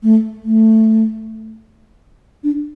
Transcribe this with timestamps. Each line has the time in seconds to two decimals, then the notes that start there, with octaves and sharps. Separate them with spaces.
0.03 A3
0.43 A3
2.44 D4